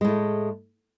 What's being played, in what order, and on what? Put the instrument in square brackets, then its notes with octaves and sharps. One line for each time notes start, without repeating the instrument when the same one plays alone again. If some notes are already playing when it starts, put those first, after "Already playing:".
[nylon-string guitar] G#3
A2
A3